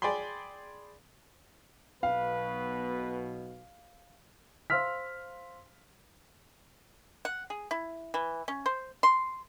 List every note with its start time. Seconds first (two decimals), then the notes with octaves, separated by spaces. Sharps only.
0.02 G#4 D5 G5 G#5 B5 C6
2.03 B1 B2 B4 F5
4.70 C5 F5 C6 E6 F6 B6
7.25 F#5
7.50 G#4
7.71 E4
8.14 E3
8.48 C#4
8.66 C5
9.03 C6